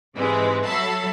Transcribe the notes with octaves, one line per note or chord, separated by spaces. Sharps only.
G#2 C3 E3 G#3
F#3 A4 E5 A5 B5 C7